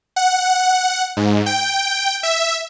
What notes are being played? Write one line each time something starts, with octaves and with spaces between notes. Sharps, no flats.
F#5
G#2
G5
E5